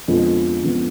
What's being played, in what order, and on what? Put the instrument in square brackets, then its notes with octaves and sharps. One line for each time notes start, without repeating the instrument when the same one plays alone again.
[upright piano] F2 D3 F3 G#3 B3
F2 D3 F3 G#3 B3